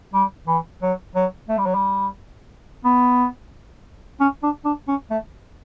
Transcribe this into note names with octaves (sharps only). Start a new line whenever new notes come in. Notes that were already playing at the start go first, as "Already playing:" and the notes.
G3
E3
F#3
F#3
A3
G3
F#3
G3
B3
C#4
D4
D4
C#4
A3